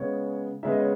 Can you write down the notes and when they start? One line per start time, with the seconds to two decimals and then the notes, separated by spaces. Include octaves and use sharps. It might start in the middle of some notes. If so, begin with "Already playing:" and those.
Already playing: C#3 G#3 B3 C#5
0.63 C#3 G#3 B3 E5
0.72 D#5
0.80 C#5